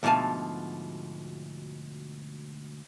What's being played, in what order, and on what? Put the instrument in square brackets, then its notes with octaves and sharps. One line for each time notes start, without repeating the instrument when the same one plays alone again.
[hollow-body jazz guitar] D2 G#2 B2 F3 G#5 A5